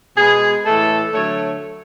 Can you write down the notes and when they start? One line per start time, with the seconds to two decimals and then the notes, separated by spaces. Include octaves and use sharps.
0.17 B2 G#3 B3 G#4
0.66 A2 E3 A3 A4
1.14 D3 F#3 A3 C#5